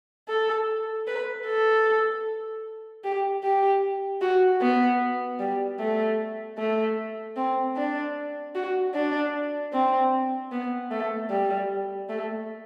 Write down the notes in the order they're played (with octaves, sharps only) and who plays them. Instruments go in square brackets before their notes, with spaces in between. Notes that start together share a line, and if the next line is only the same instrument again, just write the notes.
[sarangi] A4
B4
A4
G4
G4
F#4
B3
G3
A3
A3
C4
D4
F#4
D4
C4
B3
A3
G3
A3